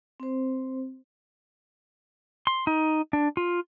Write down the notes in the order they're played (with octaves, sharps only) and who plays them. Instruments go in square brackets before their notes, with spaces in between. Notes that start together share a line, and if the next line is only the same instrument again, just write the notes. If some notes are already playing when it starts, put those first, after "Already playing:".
[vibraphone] C4 C5
[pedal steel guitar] C6
D#4
D4
F4